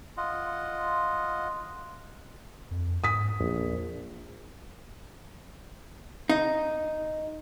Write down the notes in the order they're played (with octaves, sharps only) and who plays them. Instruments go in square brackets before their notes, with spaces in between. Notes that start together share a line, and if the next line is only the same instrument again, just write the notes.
[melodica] F4 D#5 F#5
[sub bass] F2
[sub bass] G#2 [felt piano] D#6 B6
[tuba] A#1 [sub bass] E2
[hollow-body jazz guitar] D#4